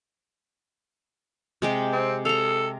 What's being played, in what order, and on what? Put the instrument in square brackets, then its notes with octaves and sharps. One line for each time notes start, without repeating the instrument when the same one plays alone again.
[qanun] C3 G#3 G4
[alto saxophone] C4
[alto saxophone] A4 [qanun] F5 A#5